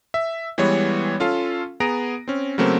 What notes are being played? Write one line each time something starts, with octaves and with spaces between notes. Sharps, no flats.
E5
E3 G3 G#3 B3 C#5
C#4 F4 A4 F5
B3 G#4 A#5 A#6 D7
C4 C#4
C#3 F#3 A3 A#3 C4 C#4